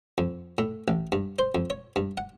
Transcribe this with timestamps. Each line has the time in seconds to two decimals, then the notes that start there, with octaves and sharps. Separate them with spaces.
0.18 F2
0.58 A2
0.88 A1
1.12 G2
1.39 C5
1.55 F2
1.70 C#5
1.96 G2
2.17 F#5